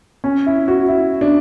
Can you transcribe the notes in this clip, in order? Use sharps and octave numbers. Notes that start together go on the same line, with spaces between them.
C#4
E4
F#4
E4
D4